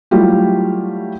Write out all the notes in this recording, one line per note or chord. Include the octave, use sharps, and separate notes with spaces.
F#3 G3 A3 E4 F4 G4